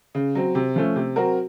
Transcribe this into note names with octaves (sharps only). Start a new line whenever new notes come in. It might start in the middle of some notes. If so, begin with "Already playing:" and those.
C#3
F#3 C4
C3
F3 A3 C#4
C3
F#3 C4 F#4 A#4